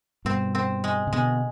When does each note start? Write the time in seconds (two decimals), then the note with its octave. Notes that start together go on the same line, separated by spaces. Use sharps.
0.25 G2 B2 C4
0.55 C4
0.84 G#3
1.07 C3
1.13 B2 D3 G#3